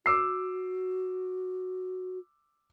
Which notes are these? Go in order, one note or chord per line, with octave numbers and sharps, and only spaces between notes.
F#4 D6 E6 C7